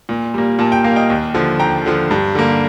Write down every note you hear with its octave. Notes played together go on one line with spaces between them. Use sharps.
A#2
G3 A#3
A#2 A5
G5
G3 A#3 F5
D#5 G5
D#2
D3 F3
D#2 G5 A#5
D3 F3
G2
D3 G3 A#3